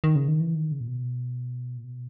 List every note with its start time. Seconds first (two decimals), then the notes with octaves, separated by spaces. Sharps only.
0.04 D#3
0.16 C#3
0.28 D#3
0.40 E3
0.55 D#3
0.72 C#3
0.81 A#2
0.88 B2
1.77 A#2
1.84 B2